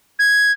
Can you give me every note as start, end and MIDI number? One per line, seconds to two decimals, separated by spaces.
0.19 0.52 92